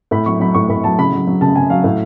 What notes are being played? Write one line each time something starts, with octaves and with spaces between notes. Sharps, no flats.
A2 B5
F#3 C#6
F#3 B5
A2 C#6
A2 B5
F#3 A5
C#3 B5
F#3
F#3
C#3 A5
C#3 G#5
F#3 F5
A2